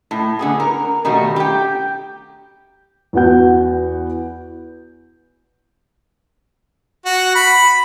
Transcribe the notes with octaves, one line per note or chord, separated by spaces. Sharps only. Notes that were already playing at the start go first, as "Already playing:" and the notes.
A2
D3 B3 G#4
A#4
B2 D#3 G3 A3 F#4
G4 G5
E2 B3 F#4 F#5 G6
F#4
B5